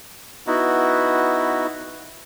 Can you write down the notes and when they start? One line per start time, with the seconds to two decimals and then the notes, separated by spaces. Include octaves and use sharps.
0.47 B3 D#4 E4 F#4